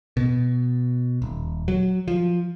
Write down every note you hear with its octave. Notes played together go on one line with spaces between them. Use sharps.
B2
D#1
F#3
F3